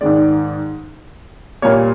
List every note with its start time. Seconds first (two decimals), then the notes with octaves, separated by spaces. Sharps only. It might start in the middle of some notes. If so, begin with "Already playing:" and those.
0.01 G#2 D#3 G#3 D5
1.62 A#2 G3 A#3 C#5